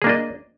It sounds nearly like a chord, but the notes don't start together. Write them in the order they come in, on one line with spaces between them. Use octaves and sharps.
G#4 A#3 D4 D#5